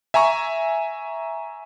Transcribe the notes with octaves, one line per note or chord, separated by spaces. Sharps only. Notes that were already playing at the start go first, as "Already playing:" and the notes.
E5 G#5 A#5 C#6